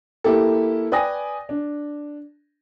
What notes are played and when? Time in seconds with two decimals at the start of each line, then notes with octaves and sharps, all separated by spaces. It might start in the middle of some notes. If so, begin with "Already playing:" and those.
0.24 A#3 E4 G4 A4
0.92 B4 D5 G5 G#5 D#6 A#6
1.49 D4